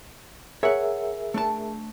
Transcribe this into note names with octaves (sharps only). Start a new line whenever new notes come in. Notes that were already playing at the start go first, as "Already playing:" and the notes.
G#4 A#4 C#5 E5 F#5
A3 D4 A5